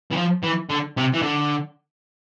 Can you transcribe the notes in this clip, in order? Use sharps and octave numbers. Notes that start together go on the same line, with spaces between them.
E3
F3
E3
D3
C3
E3
D3